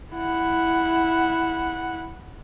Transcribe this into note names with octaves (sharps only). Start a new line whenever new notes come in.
E4 F#5